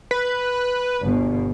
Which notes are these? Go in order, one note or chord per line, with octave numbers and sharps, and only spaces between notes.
B4
G1 B2